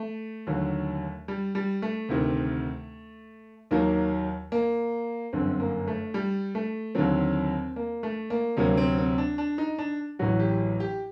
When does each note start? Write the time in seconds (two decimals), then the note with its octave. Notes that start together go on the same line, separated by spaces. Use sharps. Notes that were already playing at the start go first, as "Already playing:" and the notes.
Already playing: A3
0.47 D#2 D3 F#3
1.28 G3
1.55 G3
1.82 A3
2.09 D2 C3 D#3
3.71 D#2 D#3 F#3 A#3
4.52 A#3
5.33 G1 F#2 D3 C4
5.60 A#3
5.87 A3
6.14 G3
6.55 A3
6.95 D#2 D3 F#3 C4
7.76 A#3
8.03 A3
8.30 A#3
8.57 D2 C3 F#3 A#3
8.77 C4
8.98 C4
9.18 D4
9.38 D4
9.58 D#4
9.79 D4
10.19 A1 A2 F#3 F#4
10.40 G4
10.80 G4